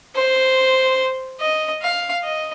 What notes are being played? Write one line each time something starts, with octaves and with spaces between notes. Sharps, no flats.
C5
D#5
F5
D#5